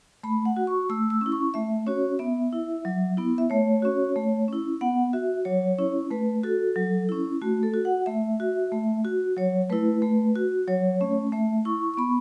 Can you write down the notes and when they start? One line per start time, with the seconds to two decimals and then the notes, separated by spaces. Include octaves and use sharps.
0.23 A3 B5
0.45 F#5
0.57 F#4
0.67 C#6
0.89 A3 E6
1.10 E6
1.21 C#4 E4
1.32 C#6
1.54 A3 E5
1.86 C#4 F#4 C#5
2.19 B3 E5
2.52 E4
2.85 F#3
3.17 B3 E4
3.38 E5
3.50 A3 C#5
3.82 C#4 F#4
4.16 A3
4.48 C#4 E4
4.81 B3 F#5
5.13 F#4 E5
5.45 F#3 C#5
5.78 C#4 E4
6.11 A3 B4
6.44 F#4 A4
6.76 F#3
7.09 C#4 E4
7.41 A3 F#4
7.63 A4
7.74 F#4
7.85 F#5
8.06 A3 E5
8.40 F#4
8.72 A3
9.05 F#4
9.37 F#3 C#5
9.70 A3 E4 B4
10.02 A3
10.36 F#4
10.67 F#3 C#5
11.00 A3 C#4
11.32 A3 E5
11.65 E4 C#6
11.94 C#6
11.97 B3 B5